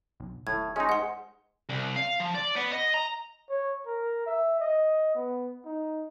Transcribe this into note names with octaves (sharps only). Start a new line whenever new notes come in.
B1
D#1 A2 G#6
G#3 C#4 D#4
G#2 F#5 C6
C2
F5
F3
D5
B3
D#5
A#5
C#5
A#4
E5
D#5
B3
D#4